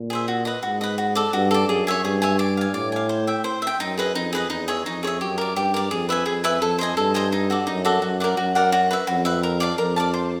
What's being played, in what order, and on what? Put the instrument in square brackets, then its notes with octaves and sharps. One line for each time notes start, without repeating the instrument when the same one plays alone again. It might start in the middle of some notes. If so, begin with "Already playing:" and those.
Already playing: [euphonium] A#2
[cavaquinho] G#4 C5 E5
F#4
B4 D#5
[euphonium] G#2 [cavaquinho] F#4
[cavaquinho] B4 D#5
F#4
A4 D5
[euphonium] G2 [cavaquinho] F#4
[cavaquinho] A4 D5
[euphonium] F#2 [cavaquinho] G#4
[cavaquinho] C#5 E5 G#5
[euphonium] G2 [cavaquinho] G#4
[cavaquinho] C#5 E5 G#5
D5
F5 G#5
[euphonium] A2 [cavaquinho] D5
[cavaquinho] F5 G#5
C5
E5 G5
C5
E5 G5
[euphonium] F#2 [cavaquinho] D#4
[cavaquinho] G#4 B4 D#5
[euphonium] F2 [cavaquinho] D#4
[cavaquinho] G#4 B4 D#5
[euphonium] E2 [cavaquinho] D#4
[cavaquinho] G#4 C#5 E5
[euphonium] F2 [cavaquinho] D#4
[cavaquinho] G#4 C#5 E5
[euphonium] F#2 [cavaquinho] G4
[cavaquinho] A#4 D5
[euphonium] G2 [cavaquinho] G4
[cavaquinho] A#4 D5
[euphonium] F2 [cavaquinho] G#4
[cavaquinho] B4 E5 G#5
[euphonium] F2 [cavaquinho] G#4
[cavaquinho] B4 E5 G#5
[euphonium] F2 [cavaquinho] A4
[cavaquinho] C5 D#5 G#5
[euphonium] G2 [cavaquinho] A4
[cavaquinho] C5 D#5 G#5
D#4
F#4 A4 D5
[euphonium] F#2 [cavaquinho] D#4
[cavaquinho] F#4 A4 D5
[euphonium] F#2 [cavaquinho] F#4
[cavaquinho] A#4 D5 F#5
[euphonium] F#2 [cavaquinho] F#4
[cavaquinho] A#4 D5 F#5
F#4
B4 E5
[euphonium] F2 [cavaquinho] F#4
[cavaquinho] B4 E5
A#4
D5 F5 A5
[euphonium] F2 [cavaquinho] A#4
[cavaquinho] D5 F5 A5
C5